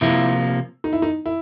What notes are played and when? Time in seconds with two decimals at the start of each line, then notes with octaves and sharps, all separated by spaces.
0.01 C3 F3 A#3 E4
0.84 D#4
0.93 E4
1.02 D#4
1.26 E4